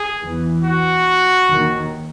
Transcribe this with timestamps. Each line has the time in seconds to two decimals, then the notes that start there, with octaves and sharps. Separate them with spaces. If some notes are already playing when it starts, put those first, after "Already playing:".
Already playing: G#4
0.21 E2 E3
0.64 F#4
1.50 D#2 D#3